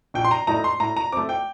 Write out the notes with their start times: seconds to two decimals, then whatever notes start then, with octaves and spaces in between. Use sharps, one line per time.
0.14 A#1 G5
0.25 C6
0.31 A#5
0.47 A2 A3 D#4 A#5
0.64 C6
0.80 A2 A#5
0.97 A#5
1.12 A3 C4 D6
1.29 G5